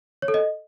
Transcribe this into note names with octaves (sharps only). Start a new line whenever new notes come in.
C#5
A4
D#5